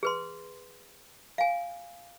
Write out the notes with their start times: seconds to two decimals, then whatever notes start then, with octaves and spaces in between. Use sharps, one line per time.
0.03 G#4 B4 C6
1.38 F5 G#5